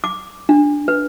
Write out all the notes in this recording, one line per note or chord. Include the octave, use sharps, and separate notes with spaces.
D6
D4
B4